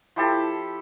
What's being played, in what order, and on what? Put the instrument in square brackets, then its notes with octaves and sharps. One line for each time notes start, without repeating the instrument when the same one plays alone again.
[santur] F3 E4 G4 A4